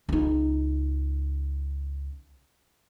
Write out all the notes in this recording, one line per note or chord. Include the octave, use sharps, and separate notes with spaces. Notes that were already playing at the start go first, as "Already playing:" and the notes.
C#2 D#4